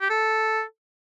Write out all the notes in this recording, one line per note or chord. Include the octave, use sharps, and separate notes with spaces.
G4
A4